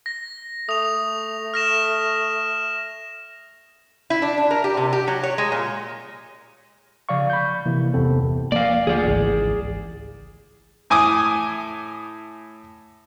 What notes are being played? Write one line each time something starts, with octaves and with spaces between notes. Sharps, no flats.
A#6
A3 D#6 F7
F6 A#6 E7
E4
D4
D4
A#4
G4
C3
G4
F#3
C#5
G#3
A#2
C#3 F3 D5 F5 C#6
B5 G6
C3 E3 A#3 E4
G1 E2 C3 B3 C4 A4
F3 A#3 D5 F5
D2 F3 G#4 D5
G#1 C#2 E3
A2 G#5 D6 D#6